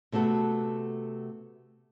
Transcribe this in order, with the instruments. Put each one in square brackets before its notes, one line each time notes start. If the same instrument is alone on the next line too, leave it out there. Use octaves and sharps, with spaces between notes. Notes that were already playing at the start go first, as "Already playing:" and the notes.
[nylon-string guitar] C3 A3 B3 F#4 A4